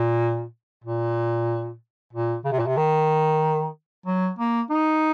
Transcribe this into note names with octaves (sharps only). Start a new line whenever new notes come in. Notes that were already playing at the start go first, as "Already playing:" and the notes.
Already playing: A#2
A#2
A#2
C#3
C3
A#2
C3
D#3
F#3
A#3
D#4